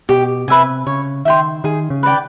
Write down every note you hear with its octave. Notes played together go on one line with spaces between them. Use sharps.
B2 G4
C3 B4 E5 G#5
C#3 C#5
D#3 E5 G5 C6
D#3 G#4
C#3
B4 D5 G5